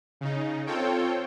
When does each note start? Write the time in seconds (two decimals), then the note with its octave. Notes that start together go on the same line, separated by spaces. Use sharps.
0.21 C#3 D#4
0.66 C4 F4 A4 C#5 G5